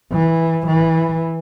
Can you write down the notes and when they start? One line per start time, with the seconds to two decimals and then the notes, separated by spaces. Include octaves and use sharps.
0.13 E3
0.68 E3